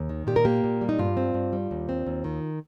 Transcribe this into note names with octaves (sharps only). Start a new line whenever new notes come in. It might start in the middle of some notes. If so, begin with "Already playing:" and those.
Already playing: D#2
D#3
A#2 G4
A#4
A#3 G4
A#2
G3
D#4
G2 F4
C4
G2
G3
D#2
C4
D#2
D#3